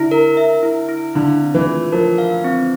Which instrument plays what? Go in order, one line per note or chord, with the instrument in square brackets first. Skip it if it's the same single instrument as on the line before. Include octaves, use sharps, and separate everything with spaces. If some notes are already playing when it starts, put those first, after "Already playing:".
Already playing: [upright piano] D3 [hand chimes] E4
[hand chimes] A#4
E5
E4
E4
[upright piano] D3 [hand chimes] F5
[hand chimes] C4
[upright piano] E3
[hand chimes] F4
[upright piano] F3 [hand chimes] A#4
[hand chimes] F5
C4